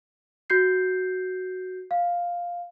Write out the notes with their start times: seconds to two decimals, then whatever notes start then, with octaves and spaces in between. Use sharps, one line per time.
0.50 F#4 G6 C7
1.91 F5